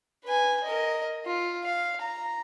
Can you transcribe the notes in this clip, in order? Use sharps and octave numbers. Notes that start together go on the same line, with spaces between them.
B4 G#5
A#4 D#5
F4
F5
A#5